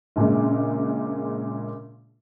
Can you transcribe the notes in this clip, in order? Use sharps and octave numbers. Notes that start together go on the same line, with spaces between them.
A#1 A#2 C#3 G#3